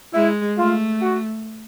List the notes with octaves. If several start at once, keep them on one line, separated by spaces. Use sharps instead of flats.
G#3 E4
A3 F4
F#4